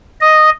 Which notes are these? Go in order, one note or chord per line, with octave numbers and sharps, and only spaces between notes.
D#5